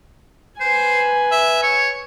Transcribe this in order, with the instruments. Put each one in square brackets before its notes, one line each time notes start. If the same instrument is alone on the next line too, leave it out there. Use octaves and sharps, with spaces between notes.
[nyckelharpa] B4 G#5 [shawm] C5
[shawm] E5
C#5